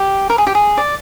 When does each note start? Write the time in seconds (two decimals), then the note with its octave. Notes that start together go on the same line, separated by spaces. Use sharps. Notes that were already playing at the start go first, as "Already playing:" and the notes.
Already playing: G4
0.30 A#4
0.38 G#4
0.47 G4
0.55 G#4
0.77 D5